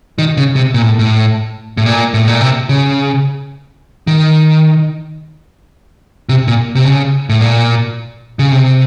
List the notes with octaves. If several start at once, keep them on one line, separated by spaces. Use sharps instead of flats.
D#3
C#3
C3
A#2
A2
A2
A2
A#2
A2
A#2
C3
C#3
D#3
C3
A#2
C3
C#3
A2
A#2
C#3
C3